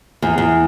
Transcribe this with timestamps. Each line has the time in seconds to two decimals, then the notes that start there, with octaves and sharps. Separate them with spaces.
0.22 E2
0.38 E2